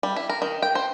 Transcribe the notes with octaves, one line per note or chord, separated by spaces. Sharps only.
G3
E4
A#4
D#3
G5
C5